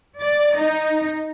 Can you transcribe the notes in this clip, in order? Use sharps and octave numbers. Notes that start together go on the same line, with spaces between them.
D5
D#4